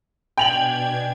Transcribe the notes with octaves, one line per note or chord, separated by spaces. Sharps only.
B2 D4 G5 G#5 G#6 F7 F#7